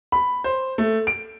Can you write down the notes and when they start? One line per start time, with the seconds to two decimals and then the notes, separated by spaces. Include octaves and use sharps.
0.12 B5
0.44 C5
0.78 A3
1.07 D7